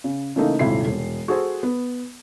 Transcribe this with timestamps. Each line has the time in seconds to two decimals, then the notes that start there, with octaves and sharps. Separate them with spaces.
0.04 C#3
0.36 C#3 E3 A3 A#3 D#4
0.59 D#1 G#1 C3 E4 C7
0.87 E1
1.28 F#4 G#4 A4 C5
1.63 B3